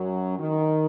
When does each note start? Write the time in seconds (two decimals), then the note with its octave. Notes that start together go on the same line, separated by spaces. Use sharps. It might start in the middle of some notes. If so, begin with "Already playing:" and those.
Already playing: F#2 F#3
0.38 D#3